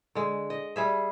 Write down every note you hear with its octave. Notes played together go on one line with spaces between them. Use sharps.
D3 G#3
D#5
G3 G#4 E5